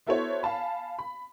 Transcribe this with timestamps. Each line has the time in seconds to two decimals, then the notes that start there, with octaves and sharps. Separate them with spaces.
0.07 B3 E4 F#4 A4 C5 C#5
0.43 F5 G#5 A5 B5
0.99 B5